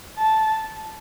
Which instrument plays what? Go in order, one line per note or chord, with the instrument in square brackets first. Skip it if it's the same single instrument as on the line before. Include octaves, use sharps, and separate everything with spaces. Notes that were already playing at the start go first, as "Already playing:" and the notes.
[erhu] A5